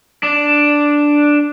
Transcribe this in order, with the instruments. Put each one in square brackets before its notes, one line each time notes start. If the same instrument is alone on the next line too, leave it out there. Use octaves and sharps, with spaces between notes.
[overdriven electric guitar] D4